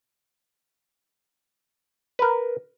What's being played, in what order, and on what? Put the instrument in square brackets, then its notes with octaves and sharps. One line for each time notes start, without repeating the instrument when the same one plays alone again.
[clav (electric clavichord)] A#4 B4